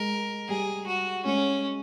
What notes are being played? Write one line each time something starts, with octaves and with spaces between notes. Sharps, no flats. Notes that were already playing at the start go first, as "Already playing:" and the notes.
Already playing: G#3 A#4
G3 G#4
F#4
G#3 C#4